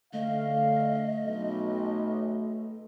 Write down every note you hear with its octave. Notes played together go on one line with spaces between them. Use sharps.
D3 A3 D#5 F5
B1